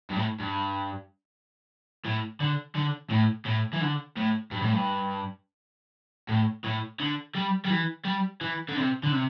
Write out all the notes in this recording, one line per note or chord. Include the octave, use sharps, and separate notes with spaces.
G2
A2
G2
A2
D3
D3
A2
A2
E3
D3
A2
G2
A2
G2
A2
A2
D3
G3
G3
E3
G3
E3
D3
C3
D3
C3